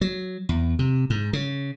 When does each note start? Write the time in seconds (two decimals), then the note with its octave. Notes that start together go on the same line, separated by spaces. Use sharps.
0.01 F#3
0.49 E2
0.79 C3
1.10 G#2
1.33 C#3